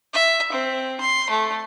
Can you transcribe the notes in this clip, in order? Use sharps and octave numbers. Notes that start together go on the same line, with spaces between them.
E5
C4
C6
A3